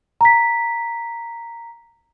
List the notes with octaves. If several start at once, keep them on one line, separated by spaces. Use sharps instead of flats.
A#5 B6